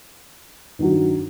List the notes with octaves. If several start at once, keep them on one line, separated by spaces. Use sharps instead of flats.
G2 D#3 F#3